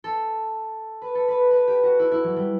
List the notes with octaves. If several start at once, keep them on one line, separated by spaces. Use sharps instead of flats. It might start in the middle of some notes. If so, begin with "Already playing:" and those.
A4
B4
A4
B4
B4
G4
F#4
E4
E4
F#3
G3